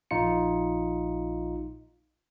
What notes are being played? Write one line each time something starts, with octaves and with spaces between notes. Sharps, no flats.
A#1 D#4 F4 C#7